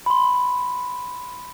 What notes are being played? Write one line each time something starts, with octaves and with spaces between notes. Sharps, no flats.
B5 C6